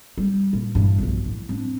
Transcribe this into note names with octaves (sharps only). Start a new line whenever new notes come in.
G3
A#2
G2 E3
B1 F3
A2
C4 D4